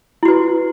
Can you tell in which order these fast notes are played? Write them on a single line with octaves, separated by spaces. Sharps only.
E4 F#4 B4